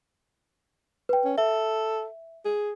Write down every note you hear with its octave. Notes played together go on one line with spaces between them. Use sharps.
B4 G5
C#4
A4 E5
G#4